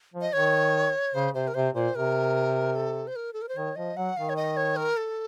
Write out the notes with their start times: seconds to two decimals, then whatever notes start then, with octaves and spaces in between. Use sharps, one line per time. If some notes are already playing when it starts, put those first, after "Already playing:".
0.14 F3
0.21 D#5
0.33 D#3 C#5
1.14 C#3 C5
1.34 C3 C5
1.48 A#4
1.54 C3 C5
1.75 A#2 C5
1.94 C3 A#4
2.76 A4
3.07 C5
3.16 A#4
3.33 A4
3.42 A#4
3.49 C5
3.56 D#3 C#5
3.76 F3 D#5
3.96 F#3 F#5
4.17 D#3 F5
4.29 C#5
4.36 D#5
4.57 C#5
4.76 A#4
4.97 A4